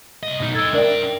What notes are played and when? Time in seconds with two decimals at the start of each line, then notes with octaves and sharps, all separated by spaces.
0.23 C2 D#5
0.40 B2 D#4
0.54 A4 D#5 E6 G#6 A6
0.74 D4 A#4 D5 E5 G5